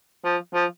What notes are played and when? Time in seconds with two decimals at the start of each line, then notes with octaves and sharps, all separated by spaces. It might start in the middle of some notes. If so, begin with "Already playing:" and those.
0.24 F3
0.54 F3